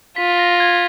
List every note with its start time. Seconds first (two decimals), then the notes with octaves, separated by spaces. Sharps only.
0.16 F4 B6
0.39 A#6
0.60 G#6